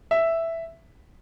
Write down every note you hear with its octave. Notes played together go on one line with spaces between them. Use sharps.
E5